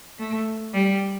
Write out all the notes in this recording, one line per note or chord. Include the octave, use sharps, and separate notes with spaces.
A3
G3